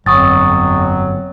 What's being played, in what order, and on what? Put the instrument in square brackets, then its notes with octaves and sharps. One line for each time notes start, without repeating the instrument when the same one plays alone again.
[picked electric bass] G1 [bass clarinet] F2 [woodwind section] F#3 [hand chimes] C#6 D#6 A6